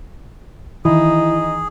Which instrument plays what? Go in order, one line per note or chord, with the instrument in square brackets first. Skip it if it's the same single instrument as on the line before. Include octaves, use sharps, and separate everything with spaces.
[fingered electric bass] D#3 E3 [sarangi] D#4 [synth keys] E4 [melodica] G#4